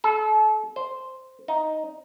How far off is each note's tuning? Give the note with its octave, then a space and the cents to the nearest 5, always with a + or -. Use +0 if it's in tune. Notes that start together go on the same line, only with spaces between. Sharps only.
A4 -35
C5 -5
D#4 +5